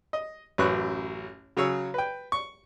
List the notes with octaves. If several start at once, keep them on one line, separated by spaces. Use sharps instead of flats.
D#5
A1 F#2 F#3 B4 C#6 F#6
C#3 F#3 G#4 C#5 E6
B4 G5
C#6